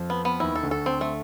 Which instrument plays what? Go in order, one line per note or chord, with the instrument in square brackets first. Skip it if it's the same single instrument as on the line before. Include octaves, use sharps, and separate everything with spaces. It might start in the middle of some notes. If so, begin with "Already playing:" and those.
Already playing: [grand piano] F2 F3
[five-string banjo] B3
B3
[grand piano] D#2 D#3 [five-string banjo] E4
[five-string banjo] A4
[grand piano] D2 D3
[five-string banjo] A4
C4
A3